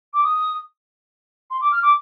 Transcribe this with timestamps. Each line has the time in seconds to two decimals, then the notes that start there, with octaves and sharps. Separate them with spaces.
0.14 D6
0.24 D#6
1.51 C6
1.61 D6
1.72 F6
1.83 D6